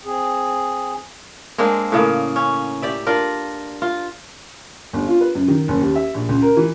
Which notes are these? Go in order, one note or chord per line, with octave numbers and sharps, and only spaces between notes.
C4 G#4
G#3 A#3 C4 D4
A2 C#3 A#3
C#4
G4 D5 E5
D4 F4 A#4
F4
G1
F4
B4
F#2
D#3
F#1
D#2
E5
A#1
C#2
A#4
E3